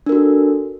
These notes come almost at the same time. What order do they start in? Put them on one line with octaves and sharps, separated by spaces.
D4 A#4 F#4 A4